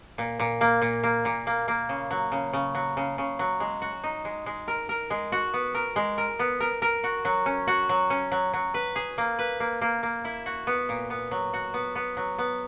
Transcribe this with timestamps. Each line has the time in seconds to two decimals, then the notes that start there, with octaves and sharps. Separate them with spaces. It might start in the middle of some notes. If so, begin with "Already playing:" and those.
0.18 A#2
0.39 A#2
0.61 A#3
0.81 A#2
1.03 A#3
1.25 A#2
1.47 A#3
1.68 A#3
1.89 C#3
2.11 F#3
2.32 C#3
2.53 C#3
2.75 F#3
2.97 C#3
3.18 C#3
3.39 F#3
3.60 G#3
3.82 F#4
4.03 D#4
4.25 G#3
4.46 G#3
4.68 A#4
4.89 A#4
5.10 G#3
5.32 F#4
5.54 B3
5.74 A#4
5.96 G#3
6.18 A#4
6.39 B3
6.60 A#4
6.82 A#4
7.04 F#4
7.25 F#3
7.46 C#4
7.67 F#4
7.89 F#3
8.10 C#4
8.31 F#3
8.53 F#3
8.74 B4
8.95 G#4
9.18 A#3
9.39 B4
9.60 A#3
9.81 A#3
10.03 A#3
10.25 E4
10.46 F#4
10.67 B3
10.89 A#2
11.10 B3
11.31 F#3
11.53 F#4
11.74 B3
11.95 B3
12.17 F#3
12.38 B3